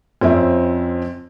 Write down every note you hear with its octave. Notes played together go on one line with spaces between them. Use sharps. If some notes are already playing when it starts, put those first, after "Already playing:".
F2 F3 C4 C#4 E5